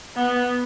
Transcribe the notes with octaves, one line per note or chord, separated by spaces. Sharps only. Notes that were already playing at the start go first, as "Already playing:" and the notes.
B3